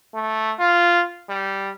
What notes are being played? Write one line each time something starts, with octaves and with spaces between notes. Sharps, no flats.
A3
F4
G3